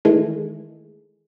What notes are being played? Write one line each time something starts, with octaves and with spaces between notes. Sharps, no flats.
D#3 E3 G#3 A3